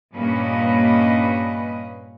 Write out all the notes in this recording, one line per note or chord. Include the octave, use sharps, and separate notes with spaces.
G2 A#2 A#3 C#4 B4 D#5